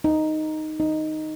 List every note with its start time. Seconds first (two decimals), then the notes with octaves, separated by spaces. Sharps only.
0.04 D#4
0.80 D#4